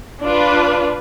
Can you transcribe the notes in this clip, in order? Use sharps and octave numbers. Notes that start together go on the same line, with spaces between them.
D4 F4 B4